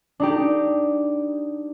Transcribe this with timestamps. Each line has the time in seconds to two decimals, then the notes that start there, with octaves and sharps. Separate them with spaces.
0.20 D4 D#4 G4